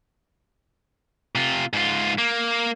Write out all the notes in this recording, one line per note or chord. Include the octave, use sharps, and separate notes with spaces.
C3 F4
G#2 F4
A#3